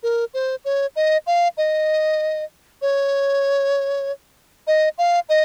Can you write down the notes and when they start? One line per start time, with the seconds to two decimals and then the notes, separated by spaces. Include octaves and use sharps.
0.03 A#4
0.34 C5
0.65 C#5
0.96 D#5
1.27 F5
1.57 D#5
2.82 C#5
4.67 D#5
4.98 F5
5.29 D#5